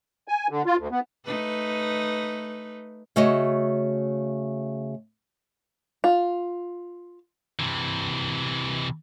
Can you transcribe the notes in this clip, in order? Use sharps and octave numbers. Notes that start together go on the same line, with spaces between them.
G#5
D3
F4
D2
B3
A3 D#4 B4
C#3 A3 F#4 C#5 D#5
F4
C3 E3